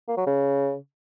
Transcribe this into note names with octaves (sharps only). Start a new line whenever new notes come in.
A#3
F#3
C#3